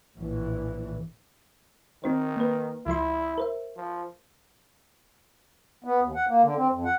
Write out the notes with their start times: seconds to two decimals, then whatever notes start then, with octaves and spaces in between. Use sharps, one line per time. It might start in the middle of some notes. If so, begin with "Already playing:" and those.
0.17 A#1 A2 E3
2.04 D#3 C4 D#4 C5
2.36 A#3 B4
2.86 C#2 F3 E4 C6
3.38 A#4 C5 E5
3.76 F3
5.84 B3
6.02 D#2
6.15 F#5
6.28 A#3
6.43 D3
6.56 C4
6.71 F2
6.85 F#5